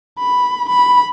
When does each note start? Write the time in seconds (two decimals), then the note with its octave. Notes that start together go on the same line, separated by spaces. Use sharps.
0.19 B5
0.69 B5